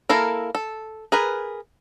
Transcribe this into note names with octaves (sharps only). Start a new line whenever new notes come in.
A#3 E4 A4 A#4
A4
G#4 A#4 B4